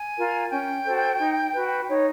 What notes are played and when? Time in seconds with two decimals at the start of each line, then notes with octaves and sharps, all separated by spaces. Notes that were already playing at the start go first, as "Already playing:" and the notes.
Already playing: G#5
0.17 F4 A#4
0.51 C#4 G5
0.85 F#4 A4 C5
1.19 D#4
1.53 F#4 B4
1.88 D#4 C#5